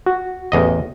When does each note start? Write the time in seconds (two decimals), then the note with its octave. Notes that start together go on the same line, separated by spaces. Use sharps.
0.06 F#4
0.52 A1 E2 D#5